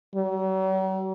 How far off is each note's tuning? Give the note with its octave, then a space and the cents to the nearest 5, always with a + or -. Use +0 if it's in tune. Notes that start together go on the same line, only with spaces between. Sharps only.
F#3 +45